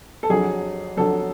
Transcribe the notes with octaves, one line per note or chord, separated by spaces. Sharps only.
A4
F2 D3 F#3 G#4
F2 D3 F#3 A4